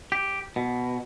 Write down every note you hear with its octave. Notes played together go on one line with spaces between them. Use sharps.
G4
B2